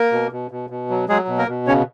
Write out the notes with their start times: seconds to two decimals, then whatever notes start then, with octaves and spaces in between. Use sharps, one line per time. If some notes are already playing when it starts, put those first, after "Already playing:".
Already playing: A#3 A#4
0.12 B2
0.32 B2
0.51 B2
0.70 B2
0.90 F#3
1.08 F#3 G#3 G#4
1.28 B2
1.38 A#3 A#4
1.48 B2
1.67 C#3 C#4 C#5